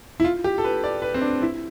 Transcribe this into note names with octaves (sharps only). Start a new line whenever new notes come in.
E4
F4
G4
A4
B4
D5
B4
C4
D4
E4